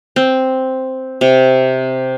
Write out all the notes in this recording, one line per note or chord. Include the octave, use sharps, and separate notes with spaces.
C4
C3